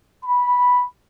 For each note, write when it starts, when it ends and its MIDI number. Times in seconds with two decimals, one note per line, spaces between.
0.24 0.84 83